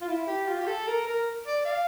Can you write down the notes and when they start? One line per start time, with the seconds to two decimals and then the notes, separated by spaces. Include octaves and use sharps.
0.01 F4
0.08 E4
0.27 G4
0.48 F4
0.60 G4
0.67 A4
0.87 A#4
1.07 A#4
1.46 D5
1.65 F5